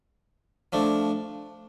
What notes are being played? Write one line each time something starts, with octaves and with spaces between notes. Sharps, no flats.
F3 A3 D4